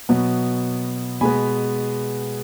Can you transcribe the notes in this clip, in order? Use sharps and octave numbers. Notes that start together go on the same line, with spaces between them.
B2 F#3 B3
B2 G#3 B3 G#5 B5